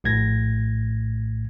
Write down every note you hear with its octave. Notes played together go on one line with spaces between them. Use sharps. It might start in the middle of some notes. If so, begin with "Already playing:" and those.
A#1 A2 G#6 A#6